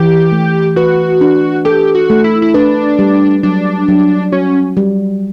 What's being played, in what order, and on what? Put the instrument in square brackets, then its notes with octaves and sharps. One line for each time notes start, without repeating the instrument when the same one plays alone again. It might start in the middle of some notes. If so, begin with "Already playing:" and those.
Already playing: [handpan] E3 [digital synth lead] G4
[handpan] A3
[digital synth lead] F#4 [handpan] B4
[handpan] D4
[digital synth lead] G4 [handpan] A4
[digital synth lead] F#4
[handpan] A3
[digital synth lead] E4
E4
[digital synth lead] D4 [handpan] B4
[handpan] G3
[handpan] F#3 [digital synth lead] D4
[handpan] F#3
[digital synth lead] C#4 [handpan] F#4
[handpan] G3